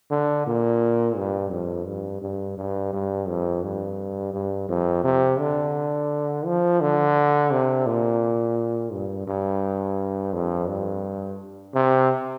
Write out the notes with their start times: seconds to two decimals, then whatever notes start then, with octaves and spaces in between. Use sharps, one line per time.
0.11 D3
0.46 A#2
1.17 G2
1.51 F2
1.87 G2
2.22 G2
2.58 G2
2.93 G2
3.28 F2
3.63 G2
4.34 G2
4.69 F2
5.04 C3
5.39 D3
6.46 F3
6.81 D3
7.51 C3
7.86 A#2
8.92 G2
9.27 G2
10.33 F2
10.69 G2
11.74 C3